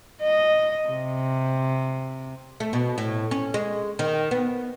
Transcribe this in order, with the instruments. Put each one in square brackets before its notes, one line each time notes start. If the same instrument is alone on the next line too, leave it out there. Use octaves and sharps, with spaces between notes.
[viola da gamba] D#5
C3
[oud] A3
B2
A2
C#4
G#3
D#3
B3